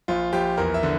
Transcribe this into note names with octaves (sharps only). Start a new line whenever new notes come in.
A#1 F4
A#1 G4
E2 A#4
E5
D3